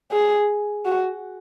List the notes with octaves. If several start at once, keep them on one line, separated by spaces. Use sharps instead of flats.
G#4
F#4